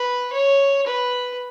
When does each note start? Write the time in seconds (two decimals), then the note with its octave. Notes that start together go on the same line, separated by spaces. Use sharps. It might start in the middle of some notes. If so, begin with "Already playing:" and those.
Already playing: B4
0.33 C#5
0.86 B4